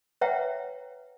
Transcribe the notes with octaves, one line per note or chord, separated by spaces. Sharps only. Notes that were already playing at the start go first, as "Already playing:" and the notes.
B4 C#5 E5 F#5 G5 A#5